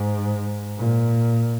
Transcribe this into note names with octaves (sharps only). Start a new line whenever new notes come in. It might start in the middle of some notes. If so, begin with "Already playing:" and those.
Already playing: G#2
A#2